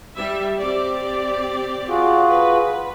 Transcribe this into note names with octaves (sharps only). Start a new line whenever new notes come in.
G3 E5
C4 G4 D5
F4 F#4 G#4
B4